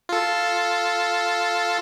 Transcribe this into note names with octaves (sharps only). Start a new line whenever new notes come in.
F4 A4